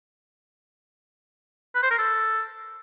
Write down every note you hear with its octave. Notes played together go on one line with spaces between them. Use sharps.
B4
C5
A#4
A4